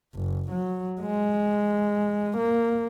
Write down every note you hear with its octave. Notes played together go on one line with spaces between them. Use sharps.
F#1
F#3
G#3
A#3